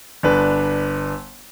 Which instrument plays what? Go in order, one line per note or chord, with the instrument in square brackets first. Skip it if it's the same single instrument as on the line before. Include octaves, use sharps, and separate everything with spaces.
[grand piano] G1 D4 B4